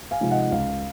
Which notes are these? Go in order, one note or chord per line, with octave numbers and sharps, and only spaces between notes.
F5 G#5
C3 F3 G#3 D#4
D#5 F#5
F#5
C#2 F5